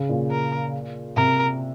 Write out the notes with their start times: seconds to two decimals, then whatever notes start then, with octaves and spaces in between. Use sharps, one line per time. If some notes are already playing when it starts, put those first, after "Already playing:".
Already playing: C#3
0.09 A#2
0.31 A#4
1.16 C3 A#4